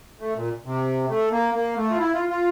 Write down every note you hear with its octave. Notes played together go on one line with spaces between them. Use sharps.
A3
A#2
C3
A3
A#3
A#3
A3
F4
E4
F4
F4